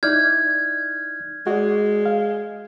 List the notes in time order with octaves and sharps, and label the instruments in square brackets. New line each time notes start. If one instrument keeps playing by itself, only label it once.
[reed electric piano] D#4 E4 D5 [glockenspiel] F6 G6 G#6
[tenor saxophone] G#3 [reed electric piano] F#4 D5
[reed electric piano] F5